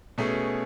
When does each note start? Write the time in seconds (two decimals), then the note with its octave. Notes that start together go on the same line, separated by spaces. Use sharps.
0.18 B2 A3 C#4 G#4